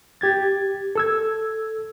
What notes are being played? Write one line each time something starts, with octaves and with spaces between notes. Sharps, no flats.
G4 G#6 A6
A4 E6 G#6